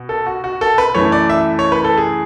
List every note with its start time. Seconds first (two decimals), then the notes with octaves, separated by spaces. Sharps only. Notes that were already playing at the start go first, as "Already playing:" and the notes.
Already playing: B2
0.09 A4
0.26 F#4
0.44 F#4
0.61 A4
0.78 B4
0.94 F#2 E3 A3 C#5
1.12 D5
1.30 E5
1.59 C#5
1.72 B4
1.84 A4
1.97 G#4